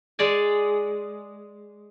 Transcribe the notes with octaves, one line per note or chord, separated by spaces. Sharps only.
G#3 G#4 D5 G#5